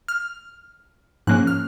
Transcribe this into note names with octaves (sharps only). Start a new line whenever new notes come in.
F6
G#2 F3 A#3 C#4 F#6
F6